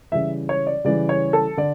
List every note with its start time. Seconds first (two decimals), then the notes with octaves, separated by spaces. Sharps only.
0.12 C#3 E3 G3 E5
0.49 C#5
0.67 D5
0.84 C#3 E3 G3 D5
1.09 C#5
1.33 A4
1.57 D3 D5